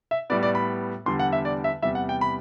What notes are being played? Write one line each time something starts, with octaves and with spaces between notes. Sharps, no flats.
E5
A2 G3 B3 D5
D5
B5
E2 D3 G3 C6
F#5
E5
D5
E5
E2 C3 G3 E5
F#5
G5
B5